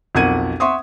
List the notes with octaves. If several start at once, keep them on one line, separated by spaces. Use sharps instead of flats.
B1 F2 A#4 F#5 G#6 D#7
E5 F#5 C6 C#6 D#6